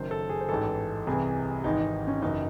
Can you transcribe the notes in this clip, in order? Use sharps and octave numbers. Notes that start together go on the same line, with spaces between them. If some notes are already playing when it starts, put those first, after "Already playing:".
Already playing: F#1 F#2 D#3 C5
A4
G#4
C5
A1 G#2 E3 A4
C2 C3 E3 G#4
G#1 G#2 E3 D#4
D#4
C#4
F#1 F#2 E3 D#4